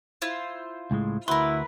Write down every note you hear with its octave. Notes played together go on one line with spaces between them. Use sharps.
E4 F4 C5
C#2 A2 G#3
D2 E4 F#4 A#4 B4 C6